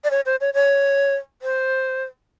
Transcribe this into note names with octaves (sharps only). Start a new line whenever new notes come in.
D5
C#5
C5
C#5
C#5
C5